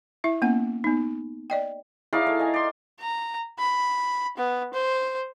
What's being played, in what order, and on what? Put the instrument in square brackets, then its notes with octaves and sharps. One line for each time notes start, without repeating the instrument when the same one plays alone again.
[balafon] E4 E5
A#3 B3 C#4 F#5
B3 D#4
D5 D#5 G5
[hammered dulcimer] D#4 D5 F5 [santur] E4 G#4 C#5
[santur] A3 C#5
D#5 G#5
[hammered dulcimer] D5 C6
[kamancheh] A#5
B5
B3
C5